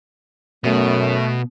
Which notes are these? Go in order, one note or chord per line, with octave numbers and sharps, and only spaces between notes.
F#2 B2 A3